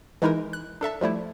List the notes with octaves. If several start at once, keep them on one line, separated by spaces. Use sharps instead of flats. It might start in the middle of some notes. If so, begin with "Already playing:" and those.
E3 G#3 D#4 E4 A#4
F#6
D4 A4 E5 A5
F3 G3 A3 E4